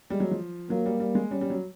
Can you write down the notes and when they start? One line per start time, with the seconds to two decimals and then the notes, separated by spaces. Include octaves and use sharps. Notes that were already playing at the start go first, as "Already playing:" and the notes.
0.10 G3 G#3
0.20 F#3
0.31 F3
0.70 F#3 A#3
0.86 G3
1.00 G3
1.15 G#3
1.31 G3 C#4
1.41 G3
1.50 F#3